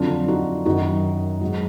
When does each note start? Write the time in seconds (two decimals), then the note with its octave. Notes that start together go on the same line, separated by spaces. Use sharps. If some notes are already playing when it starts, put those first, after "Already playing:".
Already playing: F2 D3 F#3 D4 F4
0.28 D#4 F#4
0.65 F#2 D#3 F#3 D#4 F#4
1.41 G#2 F#3